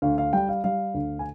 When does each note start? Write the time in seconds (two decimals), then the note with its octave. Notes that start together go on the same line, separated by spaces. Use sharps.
0.02 D2 F5
0.18 F5
0.33 G3 G5
0.49 F5
0.64 G3 F5
0.94 D2
1.19 G#5